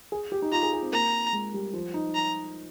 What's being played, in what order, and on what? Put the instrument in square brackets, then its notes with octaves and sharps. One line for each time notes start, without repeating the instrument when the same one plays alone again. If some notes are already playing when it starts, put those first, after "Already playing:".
[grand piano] G#4
G4
D#4
[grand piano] F4 [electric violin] A#5
[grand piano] G#4
G#4
C4
[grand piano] A#3 [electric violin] A#5
[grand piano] G#3
G3
F3
D#4
[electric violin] A#5